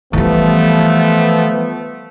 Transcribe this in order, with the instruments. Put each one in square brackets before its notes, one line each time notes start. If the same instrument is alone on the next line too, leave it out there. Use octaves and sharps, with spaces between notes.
[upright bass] E3 G3 [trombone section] F3 A3 B3